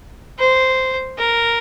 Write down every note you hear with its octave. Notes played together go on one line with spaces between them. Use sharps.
C5
A#4